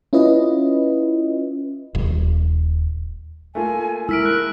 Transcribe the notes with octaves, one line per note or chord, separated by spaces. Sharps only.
C#4 E4 F4 B4 D#5
D#1
A3 A#3 F4 G#5
G#3 E4 A#4 E6 B6 D7
E6 F#6